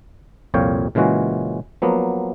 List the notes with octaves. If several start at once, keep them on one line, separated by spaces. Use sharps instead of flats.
C2 F2 A#2 C#5 F5 G5
A#2 C#3 E3 G#3 F#4
F3 F#3 A#3 B3